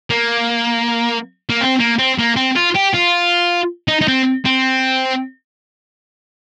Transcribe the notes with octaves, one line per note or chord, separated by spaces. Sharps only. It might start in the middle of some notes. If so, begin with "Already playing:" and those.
A#3
A#3
C4
A#3
C4
A#3
C4
F4
G4
F4
D#4
D#4
C4
C4